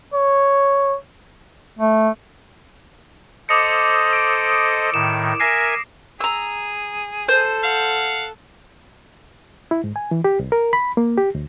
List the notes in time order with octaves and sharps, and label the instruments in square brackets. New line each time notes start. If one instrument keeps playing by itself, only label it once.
[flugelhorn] C#5
[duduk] A3
[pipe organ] A4 C5 D#5 [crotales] D6 D#6 C#7
[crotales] D7
[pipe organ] A2 D#3 [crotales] E7
[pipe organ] A#4 E5 G#5 [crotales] A#6 C7
[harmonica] G#4 [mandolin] A#5 E6
[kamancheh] A4 [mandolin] C5
[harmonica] F5 F#5
[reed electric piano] E4
G#2
G#5
E3
G4
C2
A#4
B5
A#3
G4
D2